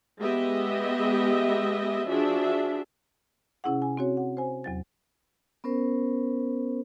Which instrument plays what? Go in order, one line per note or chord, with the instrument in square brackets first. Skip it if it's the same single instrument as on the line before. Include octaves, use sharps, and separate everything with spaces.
[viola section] G#3 B3 G4 D#5 E5
F3 D4 F#4 G#4 E5
[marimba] C3 C#4 E4 G#4 F#5
G#5
C4 F#4 C#5
F#5
C5 G#5
E2 F#3 A6
[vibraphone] B3 C#4 A#4 C5